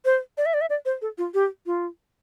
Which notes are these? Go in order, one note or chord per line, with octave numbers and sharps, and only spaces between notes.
C5
D5
E5
D5
E5
D5
C5
A4
F4
G4
F4